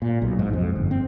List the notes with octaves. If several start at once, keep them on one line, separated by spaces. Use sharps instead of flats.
A#2
B1
G#2
F2
G1
C4